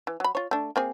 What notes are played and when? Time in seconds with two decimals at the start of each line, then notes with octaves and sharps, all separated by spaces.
0.07 E3
0.20 F#3 B5
0.35 F4 C#5
0.51 A3 D4
0.76 A#3 C4 G#4